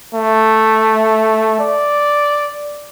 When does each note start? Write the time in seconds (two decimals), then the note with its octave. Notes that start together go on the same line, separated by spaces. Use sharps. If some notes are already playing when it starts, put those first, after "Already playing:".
0.15 A3
1.60 D5